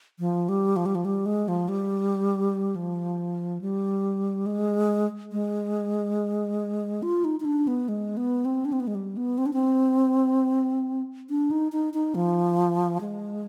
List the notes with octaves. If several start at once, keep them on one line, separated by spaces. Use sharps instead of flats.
F3
G3
F3
G3
F3
G3
G#3
F3
G3
F3
G3
G#3
G#3
F4
D#4
D#4
D4
B3
G#3
B3
C4
D4
C4
B3
G#3
G3
B3
C4
D4
C4
D4
D#4
D#4
D#4
F3
G#3